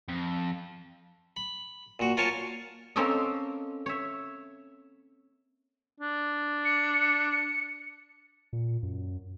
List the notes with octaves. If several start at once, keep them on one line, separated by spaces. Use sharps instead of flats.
F2
B5
A#2 F#4
F4 A#4 C#5 G#5 A5 C#6
A#3 C4 C#4 A4 D#5
C#5 E5
D4
C#7
A#2
F#2